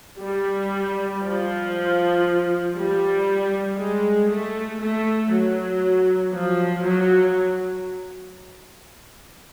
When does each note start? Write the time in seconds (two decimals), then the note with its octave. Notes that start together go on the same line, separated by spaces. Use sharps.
0.19 G3
1.21 F3
2.76 G3
3.78 G#3
4.30 A3
4.82 A3
5.33 F#3
6.35 F3
6.86 F#3